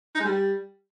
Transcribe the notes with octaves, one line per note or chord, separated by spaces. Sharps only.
D#4
G#3
G3